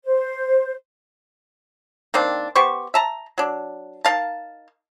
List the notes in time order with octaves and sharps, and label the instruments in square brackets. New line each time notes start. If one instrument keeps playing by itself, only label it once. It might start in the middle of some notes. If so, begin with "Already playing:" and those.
[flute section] C5
[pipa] D#3 A#3 C4 D4
B3 G4 C5 C#6
E5 A5 A#5
F#3 D4
D#4 A#4 F5 A5